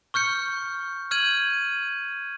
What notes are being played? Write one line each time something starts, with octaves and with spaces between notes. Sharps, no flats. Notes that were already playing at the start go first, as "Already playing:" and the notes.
C#6 F6 G6 C#7
F6 G6 G#6 D#7 F#7